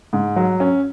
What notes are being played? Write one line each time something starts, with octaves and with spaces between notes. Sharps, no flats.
G#2
F#3
C#4